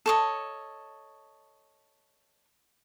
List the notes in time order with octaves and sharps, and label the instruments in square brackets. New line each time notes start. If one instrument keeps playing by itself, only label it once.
[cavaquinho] A4 C#5 D#5